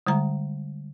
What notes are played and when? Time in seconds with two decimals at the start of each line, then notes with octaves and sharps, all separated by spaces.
0.07 D3 G3 G#3 A#5